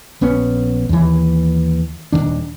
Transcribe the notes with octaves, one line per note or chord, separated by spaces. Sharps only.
A#1 B3 C#4
D#2 E3
D#1 E2 D#3 D4